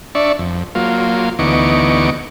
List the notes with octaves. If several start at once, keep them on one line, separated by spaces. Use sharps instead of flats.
D4 D5 E5 C#6
F2
F#3 A#3 F4
D2 E3 B3 D#4 C#6 D6